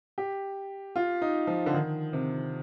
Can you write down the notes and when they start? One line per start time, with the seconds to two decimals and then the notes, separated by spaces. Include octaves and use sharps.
0.18 G4
0.96 F4
1.22 D#4
1.47 F3
1.66 D3
1.74 D#3
2.13 C3